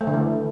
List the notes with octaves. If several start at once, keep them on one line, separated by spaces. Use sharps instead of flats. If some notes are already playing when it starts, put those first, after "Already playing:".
A3
D3
E3